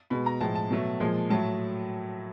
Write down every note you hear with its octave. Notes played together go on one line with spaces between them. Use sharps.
B2 G#3 B5
A#5
A2 F3 G#3 A5
A5
B2 F#3 A3
A#2 F3 G#3
A2 F#3 A3 A5